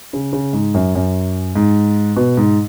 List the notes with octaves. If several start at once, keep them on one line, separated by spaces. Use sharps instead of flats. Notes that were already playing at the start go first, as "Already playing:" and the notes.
C#3
C#3
G#2
F#2
F#2
G#2
B2
G#2